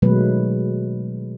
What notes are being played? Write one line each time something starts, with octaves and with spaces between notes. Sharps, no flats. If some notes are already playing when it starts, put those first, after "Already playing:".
B2 D#3 F#3 G#3 A3 B4